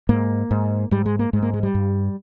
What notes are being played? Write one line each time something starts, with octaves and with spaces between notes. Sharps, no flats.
G#2 A#3
G#2
G#2 G3
G#3
A#3
G#2 G#3
A#3
G#3
G3
G2